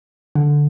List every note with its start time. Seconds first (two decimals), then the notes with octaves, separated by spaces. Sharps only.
0.35 D3